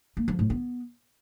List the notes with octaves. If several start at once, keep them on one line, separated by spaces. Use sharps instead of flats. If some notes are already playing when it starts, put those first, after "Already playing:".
A#3
F3
A2
B3